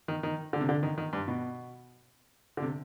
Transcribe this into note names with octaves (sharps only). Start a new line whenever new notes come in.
D#3
D#3
D3
C3
D3
D#3
D#3
G2
B2
D3
C3